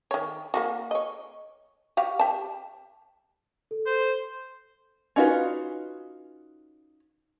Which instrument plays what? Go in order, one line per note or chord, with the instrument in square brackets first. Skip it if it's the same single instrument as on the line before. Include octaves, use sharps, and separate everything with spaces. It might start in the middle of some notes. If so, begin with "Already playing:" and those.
[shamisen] D#3 C#5
A#3 F4 F#4
C#5 D#5
F#4 G4 F5
G4 A5
[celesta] A4
[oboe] C5
[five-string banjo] C#4 D#4 F4 F#4 B4